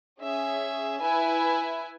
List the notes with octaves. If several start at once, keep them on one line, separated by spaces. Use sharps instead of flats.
C#4 G#4 E5
E4 B4 E5 G#5